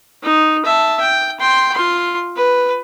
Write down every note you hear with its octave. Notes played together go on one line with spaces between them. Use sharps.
D#4
E5 A5
G5
G5 C6
F4 C6
B4